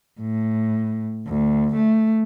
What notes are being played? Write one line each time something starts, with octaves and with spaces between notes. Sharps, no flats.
A2
D2
A3